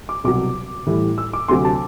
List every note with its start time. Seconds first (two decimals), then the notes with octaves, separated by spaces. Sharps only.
0.09 D6
0.24 C2 B2 F#3 D6
0.87 A2 E3 G3
1.18 E6
1.33 D6
1.48 D2 C3 F#3 C6
1.65 A5